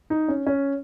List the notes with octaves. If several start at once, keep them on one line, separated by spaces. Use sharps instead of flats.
D#4
C#4
C#4